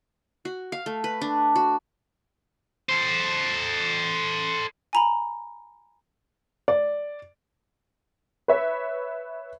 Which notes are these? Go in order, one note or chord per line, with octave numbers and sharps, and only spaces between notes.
F#4
F5
A3
B4
D4
F#4
A4 C5
G#5 A#5 B5
D5
B4 C#5 E5